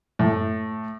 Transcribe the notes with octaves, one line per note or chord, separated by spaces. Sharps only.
A2